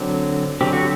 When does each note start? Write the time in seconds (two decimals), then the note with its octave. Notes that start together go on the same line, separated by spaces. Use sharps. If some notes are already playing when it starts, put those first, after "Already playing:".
Already playing: D3 F#3 C4
0.61 D3 F#3 C4 G4
0.73 F#4